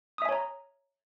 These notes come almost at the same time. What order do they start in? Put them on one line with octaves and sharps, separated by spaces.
D#6 E5 G#5 C#5 A#5